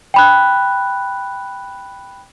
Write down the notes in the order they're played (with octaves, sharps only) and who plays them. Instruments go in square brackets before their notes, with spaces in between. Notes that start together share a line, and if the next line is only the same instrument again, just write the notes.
[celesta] G5 B5 F#6